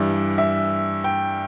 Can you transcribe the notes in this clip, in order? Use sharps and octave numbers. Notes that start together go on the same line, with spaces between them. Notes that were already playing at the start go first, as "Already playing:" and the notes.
Already playing: G2 E3 G3 D4 E5
E5
G5